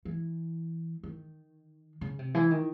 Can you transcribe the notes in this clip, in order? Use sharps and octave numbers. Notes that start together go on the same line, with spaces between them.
E3
D#3
C#3
C3
E3
D#3